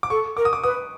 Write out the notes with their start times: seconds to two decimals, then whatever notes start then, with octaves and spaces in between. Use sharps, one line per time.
0.03 D6
0.10 A4 C#6
0.37 A#4 D6
0.45 D#6
0.53 D6
0.64 B4 D#6